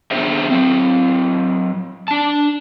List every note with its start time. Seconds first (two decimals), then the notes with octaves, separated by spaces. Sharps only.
0.11 B3 D4 G#4 C5 E5
0.50 F#3 C4
2.08 D4 A5